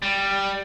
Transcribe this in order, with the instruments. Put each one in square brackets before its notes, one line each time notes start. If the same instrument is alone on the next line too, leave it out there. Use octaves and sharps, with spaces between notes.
[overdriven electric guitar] G3